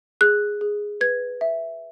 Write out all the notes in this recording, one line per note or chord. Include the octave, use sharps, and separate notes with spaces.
G#4 F#6
G#4
B4 G#6
E5